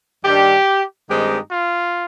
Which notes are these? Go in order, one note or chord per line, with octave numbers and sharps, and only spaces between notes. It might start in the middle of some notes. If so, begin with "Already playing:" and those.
G2 D#3 G3 D4 G4
G2 D#3 G#3 C4 D#4 G4
F4